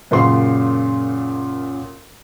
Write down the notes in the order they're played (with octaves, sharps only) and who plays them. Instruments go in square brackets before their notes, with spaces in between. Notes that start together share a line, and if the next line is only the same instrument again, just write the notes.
[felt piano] F#2 A#2 C#3 C6